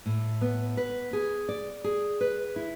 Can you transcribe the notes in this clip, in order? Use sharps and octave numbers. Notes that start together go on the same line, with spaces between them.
A2
B3
B4
G#4
D5
G#4
B4
E4